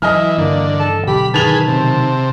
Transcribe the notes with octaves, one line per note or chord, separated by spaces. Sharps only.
E3 F#3 D#5 G#5 F6
G2 D3 E3 A#3
A4
B2 D3 F#3 G4 B5
D#3 G#4 B4 A5 F7 G7
C3